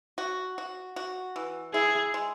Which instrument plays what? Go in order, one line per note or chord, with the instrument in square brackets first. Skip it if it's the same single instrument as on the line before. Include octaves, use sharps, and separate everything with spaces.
[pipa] F#4
F#4
F#4
E3
[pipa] E4 [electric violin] G#4
[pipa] G#3